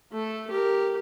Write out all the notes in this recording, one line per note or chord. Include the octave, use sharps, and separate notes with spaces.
A3 A4
G4 A#4